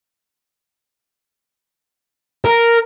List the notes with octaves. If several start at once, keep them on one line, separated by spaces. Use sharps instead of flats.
A#4